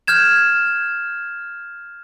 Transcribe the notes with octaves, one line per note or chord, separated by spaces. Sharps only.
F6 G6 G#6 E7